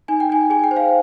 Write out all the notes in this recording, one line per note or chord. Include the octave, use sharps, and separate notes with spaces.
D#4 G#5
G5
D#4 G#5
G#4 G#5
G5
C5
F5